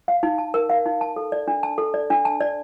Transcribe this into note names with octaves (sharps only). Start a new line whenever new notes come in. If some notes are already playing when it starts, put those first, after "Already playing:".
F5
D#4
A5
A#4
F5
D#4
A5
A4
D5
D4
A5
A4
D5
D4
A5
D5